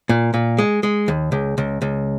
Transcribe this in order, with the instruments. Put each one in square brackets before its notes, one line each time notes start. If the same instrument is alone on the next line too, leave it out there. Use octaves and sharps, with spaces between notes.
[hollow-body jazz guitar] A#2
A#2
G#3
G#3
D#2
C#2
C#2
C#2